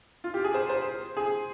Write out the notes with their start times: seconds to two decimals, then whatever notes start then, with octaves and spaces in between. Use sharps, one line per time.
0.24 F4
0.34 G4
0.44 G#4
0.54 C5
0.69 C5
1.17 G#4